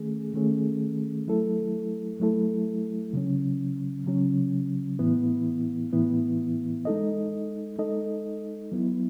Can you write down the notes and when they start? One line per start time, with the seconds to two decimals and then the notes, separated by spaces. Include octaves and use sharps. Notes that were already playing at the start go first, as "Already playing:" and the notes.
Already playing: D#3 A3 C#4 G#4
0.34 D#3 A3 C#4 G#4
1.27 F#3 A3 E4 A4
2.20 F#3 A3 E4 A4
3.13 C#3 F#3 C#4
4.06 C#3 F#3 C#4
4.99 A2 E3 B3 E4
5.93 A2 E3 B3 E4
6.85 G#3 D#4 A4 D#5
7.79 G#3 D#4 A4 D#5
8.72 F#3 B3 E4